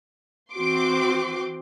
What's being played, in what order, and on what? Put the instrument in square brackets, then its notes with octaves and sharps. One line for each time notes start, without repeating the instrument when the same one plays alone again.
[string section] E3 C4 F#4 C6 D6